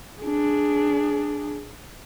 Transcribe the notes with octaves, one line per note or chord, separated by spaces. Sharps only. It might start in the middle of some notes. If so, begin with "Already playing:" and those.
D4 G#4